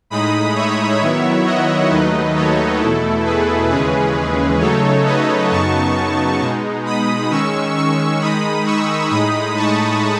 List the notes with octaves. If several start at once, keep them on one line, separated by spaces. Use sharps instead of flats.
A2 G#3 D#4 B5 D#6
C#5 E5
D#3 F#3 B3 E4 C#5 E5
D#5 F#5
D#2 D#3 F#3 A3 D#4 B4 D#5
A4 C#5
E2 B2 A3 E4 A4
G#4 B4
D#2 C#3 E3 G#3 C#4 G#4 B4
C#3 F#3 A3 D#4 A4 C#5
B4 D#5
F#2 C#3 F#3 B3 D#4 A5 C#6
B2 G#3 D#4
B5 D#6
D#3 G#3 C#4 C#6 E6
C#6 E6
D#3 G#3 D#4 B5 D#6
C#6 E6
A2 G#3 D#4 B5 D#6
A5 C#6